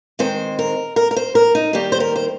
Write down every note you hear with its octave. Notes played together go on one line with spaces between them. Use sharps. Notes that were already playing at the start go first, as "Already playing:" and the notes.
D#3 G#3 C4 C5
A#4
A#4
A#4
C5
A#4
D#4
D#3 G3 A#3 G4
C5
A#4
C5